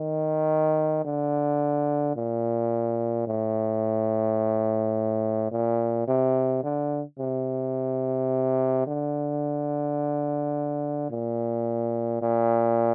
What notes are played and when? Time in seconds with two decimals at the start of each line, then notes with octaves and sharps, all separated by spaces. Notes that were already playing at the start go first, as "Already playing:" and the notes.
Already playing: D#3
1.05 D3
2.16 A#2
3.27 A2
5.51 A#2
6.08 C3
6.64 D3
7.19 C3
8.87 D3
11.11 A#2
12.22 A#2